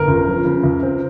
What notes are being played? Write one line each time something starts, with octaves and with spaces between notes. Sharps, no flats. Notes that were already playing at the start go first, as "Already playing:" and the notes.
Already playing: G1 A#4
C#2
F3
C#3
C#2
C4